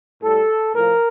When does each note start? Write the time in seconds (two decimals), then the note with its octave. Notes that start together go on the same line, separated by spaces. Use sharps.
0.22 A2 G3 A4
0.73 A2 F3 A#4